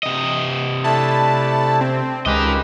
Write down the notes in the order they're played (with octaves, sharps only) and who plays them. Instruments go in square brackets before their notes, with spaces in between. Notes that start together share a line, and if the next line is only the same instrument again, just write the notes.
[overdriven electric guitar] C3 D#5
[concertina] A3 D4 E4 [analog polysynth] A5 B5
[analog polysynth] C4
[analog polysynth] C#2 G#3 [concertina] G4 B4 [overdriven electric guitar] A#4 D#5